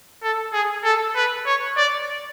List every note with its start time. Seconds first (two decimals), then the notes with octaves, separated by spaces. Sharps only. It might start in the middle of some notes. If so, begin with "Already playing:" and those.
0.23 A4
0.53 G#4
0.84 A4
1.15 B4
1.46 C#5
1.77 D5